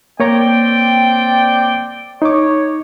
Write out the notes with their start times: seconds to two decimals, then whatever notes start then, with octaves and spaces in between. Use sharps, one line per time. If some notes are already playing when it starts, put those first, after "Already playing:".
0.20 A#3 C4 C#5 D5 G5 A#5
2.22 D#4 C#5 D6